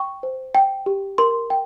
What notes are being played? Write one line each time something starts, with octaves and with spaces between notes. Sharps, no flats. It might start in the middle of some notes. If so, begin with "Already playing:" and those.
Already playing: G5 C#6
C5
G5
G4
A#4 C6
G5